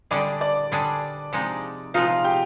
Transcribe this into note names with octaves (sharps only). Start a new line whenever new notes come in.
D3 G3 D4 G#4 D5 D6
D5 D6
D3 G3 D4 G#4
C3 F3 G#3 D#4
C3 F3 G#3 D#4 F4 F5
G4 G5